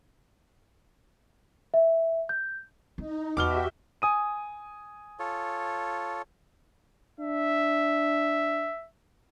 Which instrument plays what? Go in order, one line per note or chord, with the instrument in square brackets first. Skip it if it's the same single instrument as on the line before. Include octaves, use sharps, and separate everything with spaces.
[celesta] E5
G6
[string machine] D#4 [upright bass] E4
[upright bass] E2 [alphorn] B2 [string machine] F#4 G4 E5 [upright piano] D6 F6 G7
[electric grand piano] G#5 D#6 D#7
[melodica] F4 A4 C#5
[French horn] D4 [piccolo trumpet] E5